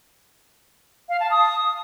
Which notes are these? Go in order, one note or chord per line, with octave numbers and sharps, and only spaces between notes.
F5
A5
D#6